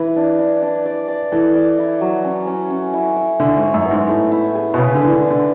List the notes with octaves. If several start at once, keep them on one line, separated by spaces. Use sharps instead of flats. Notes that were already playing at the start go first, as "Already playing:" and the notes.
Already playing: E3 E4 B4
D4
D4
D4
D5
D5
E3 A4
D5
E4
F#3
C#4
C#4
C#4
E4
E4
D3 E4
G#2
C#5
F#2
B3
G#2
A2 A3
E4
G#4
B2
C#3 B4
D3
E3 D4
D3
D4
D3